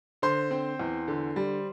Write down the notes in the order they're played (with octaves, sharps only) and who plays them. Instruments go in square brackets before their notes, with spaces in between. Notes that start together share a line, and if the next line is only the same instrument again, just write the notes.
[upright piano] D3 C5 C6
C4
E2
D3
G3